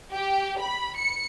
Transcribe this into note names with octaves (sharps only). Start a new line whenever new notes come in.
G4
B5
C#7